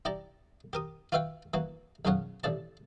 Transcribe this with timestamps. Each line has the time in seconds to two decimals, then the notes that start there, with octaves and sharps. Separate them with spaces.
0.05 E4 G4 D5 A#5
0.73 G4 A#4 D#6
1.12 F4 F#4 B4 E5 F5 G5
1.54 E3 A#3 F#4
2.05 B1 F#2 C#3 F4 C#5 F#5
2.44 A1 A2 C3 D5 A5